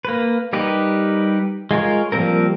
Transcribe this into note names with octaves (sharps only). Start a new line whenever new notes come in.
A#3 B4
G3 D#4 G4 A#4 B4
G#3 F4 A#4 C#5
F3 G3 A#3 C4 A#4